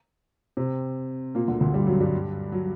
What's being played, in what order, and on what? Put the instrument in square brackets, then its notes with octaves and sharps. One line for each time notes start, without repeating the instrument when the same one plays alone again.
[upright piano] C3 C4
A#2 A#3
D2 D3
D2 D3
G2 G3
F#2 F#3
G2 G3
F#3